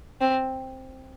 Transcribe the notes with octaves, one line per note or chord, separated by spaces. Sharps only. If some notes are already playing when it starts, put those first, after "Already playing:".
C4